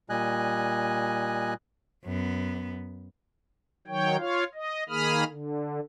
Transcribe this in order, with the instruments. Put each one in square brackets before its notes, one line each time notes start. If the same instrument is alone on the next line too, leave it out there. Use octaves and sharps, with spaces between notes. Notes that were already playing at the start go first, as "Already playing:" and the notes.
[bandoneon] A#2 G3 D#5 G#5 F#6
[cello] F#2 B3
[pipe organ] D#3 F#3 C#5 G5
F4 C#5 F5
D#5
D#3 A#3 G#4 B5 D#6 F6
D3